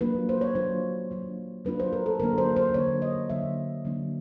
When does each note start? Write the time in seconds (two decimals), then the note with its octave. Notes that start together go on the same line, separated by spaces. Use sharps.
0.01 F#3 A#3 D4 F4 B4
0.29 C5
0.41 C#5
0.55 F#3 A#3 D4 F4 C5
1.11 F#3 A#3 D4 F4
1.65 F#3 A#3 D4 F4 B4
1.80 C5
1.93 A#4
2.06 A4
2.20 D3 F#3 A#3 D4 A#4
2.38 C5
2.56 C5
2.74 D3 F#3 A#3 D4 C#5
3.02 D#5
3.30 D3 F#3 A#3 D4 E5
3.85 D3 F#3 A#3 D4